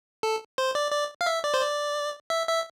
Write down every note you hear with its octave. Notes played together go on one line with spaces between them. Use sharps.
A4
C5
D5
D5
F5
E5
D5
C5
D5
E5
E5